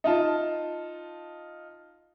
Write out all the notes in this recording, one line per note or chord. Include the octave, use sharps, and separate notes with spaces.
D#4 F4 A5